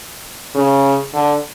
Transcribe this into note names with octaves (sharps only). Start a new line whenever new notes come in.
C#3
D3